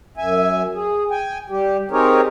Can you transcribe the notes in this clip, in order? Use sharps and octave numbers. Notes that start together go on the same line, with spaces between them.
F#2 E5 G#5
G#4
G5 G#5
G3 G4
C4 D#4 G4 G#4 A#4 C#5